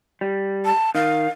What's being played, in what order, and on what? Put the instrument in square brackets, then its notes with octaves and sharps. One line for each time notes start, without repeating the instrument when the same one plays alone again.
[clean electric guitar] G3
[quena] A5
[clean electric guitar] D#3 [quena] F5